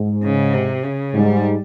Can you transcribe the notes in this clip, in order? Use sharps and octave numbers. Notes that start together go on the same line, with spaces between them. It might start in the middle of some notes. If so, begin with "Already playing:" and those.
Already playing: G#2
C#3
C3
C#3
G#2 G3